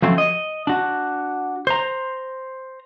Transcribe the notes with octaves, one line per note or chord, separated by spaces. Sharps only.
F3 F#3 A3 C4 C#4
D#5
D4 F#4
C5 A#5